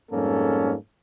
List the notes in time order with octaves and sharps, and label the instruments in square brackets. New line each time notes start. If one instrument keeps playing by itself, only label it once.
[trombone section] F2 G#2 G3 A#3 C#4 A4